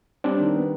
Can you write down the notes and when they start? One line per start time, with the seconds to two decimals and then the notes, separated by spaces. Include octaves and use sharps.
0.24 G3 C4 D4
0.40 D#3
0.55 B3